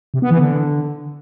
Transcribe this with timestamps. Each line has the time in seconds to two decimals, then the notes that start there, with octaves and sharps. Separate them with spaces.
0.14 C3
0.22 B3
0.31 E3
0.39 D3